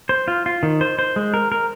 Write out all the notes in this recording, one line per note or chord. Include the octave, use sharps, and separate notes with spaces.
C5
F4
F4
D#3
C5
C5
G#3
A#4
A#4